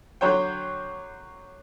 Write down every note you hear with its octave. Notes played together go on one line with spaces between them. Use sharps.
D3 F#3 C5 C#5 G5